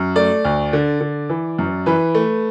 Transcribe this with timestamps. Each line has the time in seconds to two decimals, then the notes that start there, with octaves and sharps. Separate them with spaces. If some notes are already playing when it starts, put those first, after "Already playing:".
Already playing: F#2
0.15 A3 D5
0.45 D2
0.73 D3
1.01 D3
1.29 E3
1.59 F#2
1.86 E3 B4
2.15 A3